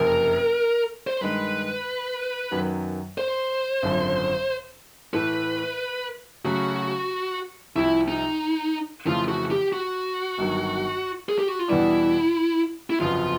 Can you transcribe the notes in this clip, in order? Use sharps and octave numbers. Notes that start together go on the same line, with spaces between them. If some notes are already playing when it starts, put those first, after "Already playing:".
Already playing: F#1 F2 C3 A#4
C5
G2 D#3 G#3 B4
F#2 D#3 F#3 B3
C5
G#1 F#2 D3 F3
A2 E3 A3 B4
C#3 F#3 A3 C#4 F#4
C2 C3 F3 E4
D#4
F2 C#3 E3 A3 F4
F#4
G4
F#4
G1 G2 D#3 F#3
G#4
G4
F#4
F4
E2 B2 G3 B3 D4 E4
E4
G1 F2 C#3 F#3 B3 F4